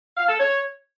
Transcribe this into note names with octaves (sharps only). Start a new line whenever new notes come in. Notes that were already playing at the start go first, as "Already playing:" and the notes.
F5
A4
C#5